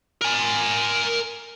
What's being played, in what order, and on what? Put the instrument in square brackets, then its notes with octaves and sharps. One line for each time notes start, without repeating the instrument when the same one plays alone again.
[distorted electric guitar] A#4 G#5